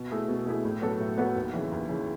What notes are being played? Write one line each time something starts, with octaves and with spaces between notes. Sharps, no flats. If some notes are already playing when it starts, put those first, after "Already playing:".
Already playing: B2
A3 E4 G#4
B2
A3 E4 G#4
A2
F#3 B3 F#4 A4
A2
F#3 B3 F#4 A4
D#2
C#3 E3
D#2
C#3 E3